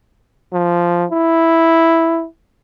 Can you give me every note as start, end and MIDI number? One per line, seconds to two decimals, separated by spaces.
0.53 1.05 53
1.12 2.26 64